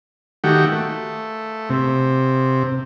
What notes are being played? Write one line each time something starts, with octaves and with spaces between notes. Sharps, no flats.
D#3 A3 F#4 G4
A3
C3